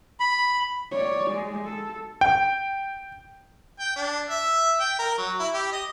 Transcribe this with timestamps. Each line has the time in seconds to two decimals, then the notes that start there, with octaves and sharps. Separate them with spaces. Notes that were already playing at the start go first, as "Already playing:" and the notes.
0.20 B5
0.92 C#5 D5
1.30 G#3
1.64 A4
2.21 G5
3.79 G5
3.96 D4
4.30 E5
4.80 G5
4.99 A#4
5.18 F#3
5.40 E4
5.54 G4
5.72 D#5